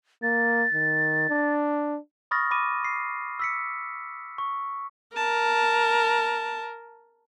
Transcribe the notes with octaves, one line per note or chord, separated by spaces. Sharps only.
A#3 A6
D#3
D4
B5 C#6 D#6 F6 A6 A#6
B5 D6 D#7
C7
E6 B6 C#7
C#6
A#4 A5